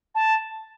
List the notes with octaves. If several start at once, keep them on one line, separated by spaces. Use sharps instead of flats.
A5